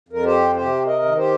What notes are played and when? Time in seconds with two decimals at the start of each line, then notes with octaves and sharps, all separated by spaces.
0.09 F2 A#4
0.24 G4 C5
0.55 C3 G4 C5
0.86 A#4 D#5
1.02 D#3
1.17 G4 C5